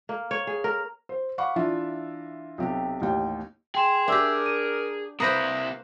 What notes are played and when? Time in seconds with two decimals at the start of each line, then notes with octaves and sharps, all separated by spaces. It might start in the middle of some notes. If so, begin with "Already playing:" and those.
0.09 A#3
0.31 C#5
0.47 G#4
0.64 A#4
1.09 C5
1.38 F5 F#5 B5 C#6 D6
1.56 E3 D4 F4 E5
2.58 B1 C3 G4
3.01 A1 D#2 G5
3.75 G#4 G5 C6 E7
4.08 D4 G4 A#4 E5 E6
4.46 D#7
5.20 C3 A#3 E4 B4 C5 D#6 A#6